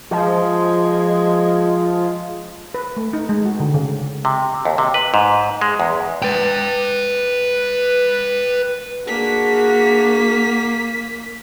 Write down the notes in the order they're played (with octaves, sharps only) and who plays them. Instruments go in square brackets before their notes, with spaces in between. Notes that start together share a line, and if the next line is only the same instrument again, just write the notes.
[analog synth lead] F3 [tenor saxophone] G#3
[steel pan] B4
A3
D#4
G#3
F#4
D3
C#3
[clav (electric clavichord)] C3
D#2
C3
B4
G#2
G#3
E2
[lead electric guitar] B4 G5
[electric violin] A#3 B6 [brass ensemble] D4 F#4 G#4